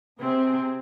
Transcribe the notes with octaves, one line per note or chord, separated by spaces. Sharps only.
C3 C4 G#4